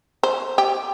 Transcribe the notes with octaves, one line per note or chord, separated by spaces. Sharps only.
C5
G4